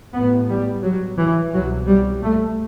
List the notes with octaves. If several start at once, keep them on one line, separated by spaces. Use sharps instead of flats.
A1 A2 B3
G3
F#3
E3
C2 B2 F#3
G3
A3